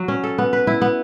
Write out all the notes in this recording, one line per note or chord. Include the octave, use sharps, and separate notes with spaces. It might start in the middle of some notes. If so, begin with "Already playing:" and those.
Already playing: F#3 F#4
C#4
A4
B3
B4
E4
B3